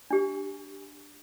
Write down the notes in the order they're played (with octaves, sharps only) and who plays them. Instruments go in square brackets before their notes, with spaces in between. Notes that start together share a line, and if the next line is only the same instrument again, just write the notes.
[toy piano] D4 G4